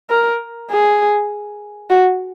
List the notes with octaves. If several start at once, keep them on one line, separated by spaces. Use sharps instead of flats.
A#4
G#4
F#4